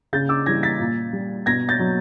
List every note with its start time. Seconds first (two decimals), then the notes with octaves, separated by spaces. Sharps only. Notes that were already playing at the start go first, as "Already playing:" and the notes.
0.13 C#3 G6 A6
0.29 D6 E6
0.46 E3 G3 G#6 A#6
0.63 A6 B6
0.80 A#2
1.13 G3
1.46 B2 G#6 A#6
1.69 G6 A6
1.79 F#3